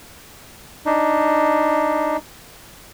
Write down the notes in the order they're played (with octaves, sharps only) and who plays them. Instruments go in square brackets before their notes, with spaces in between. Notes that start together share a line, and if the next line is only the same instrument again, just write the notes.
[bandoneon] D4 D#4